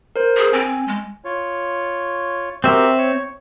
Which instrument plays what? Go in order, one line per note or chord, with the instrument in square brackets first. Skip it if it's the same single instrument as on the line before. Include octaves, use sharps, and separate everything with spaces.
[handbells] A#4 C5
[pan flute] G#4
[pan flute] C4 [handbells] G#5
[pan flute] G#3
[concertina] F4 C#5
[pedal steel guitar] C4 E5 [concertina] F#4 G4 A#4
[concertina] C#5 C#6